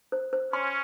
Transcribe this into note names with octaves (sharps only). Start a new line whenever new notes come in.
C5
C5
C#4 C6